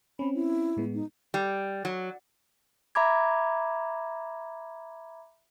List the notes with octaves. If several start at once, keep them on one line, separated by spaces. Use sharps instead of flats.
C4 C#4 B5
E4
A2 G#3 B3
D#4
G3
F#3
E5 A#5 B5 D6 G#6